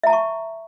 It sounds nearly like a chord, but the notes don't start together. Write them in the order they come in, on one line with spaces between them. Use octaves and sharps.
E5 A#5 A5 C#6